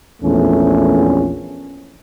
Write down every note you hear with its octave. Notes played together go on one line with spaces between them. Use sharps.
A#1 E2 A3 C#4